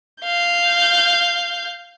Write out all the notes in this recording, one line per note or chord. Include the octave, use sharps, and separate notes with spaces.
F5 G6